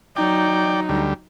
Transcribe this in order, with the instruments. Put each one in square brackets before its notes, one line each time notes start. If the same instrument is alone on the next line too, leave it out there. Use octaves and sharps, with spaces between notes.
[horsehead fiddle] F#3 D#4 [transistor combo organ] D5 G5
[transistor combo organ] D2 G3